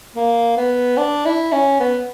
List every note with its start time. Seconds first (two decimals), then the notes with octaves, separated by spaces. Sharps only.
0.16 A#3
0.57 B3
0.97 D4
1.25 E4
1.52 C#4
1.80 B3